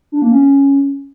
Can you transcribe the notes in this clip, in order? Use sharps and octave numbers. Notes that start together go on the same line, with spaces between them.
D4
A#3
C#4